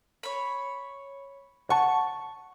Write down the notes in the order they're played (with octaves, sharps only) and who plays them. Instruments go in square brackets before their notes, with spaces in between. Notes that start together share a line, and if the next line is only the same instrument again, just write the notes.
[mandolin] C#5 B5
[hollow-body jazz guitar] F#5 A5 [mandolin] C#6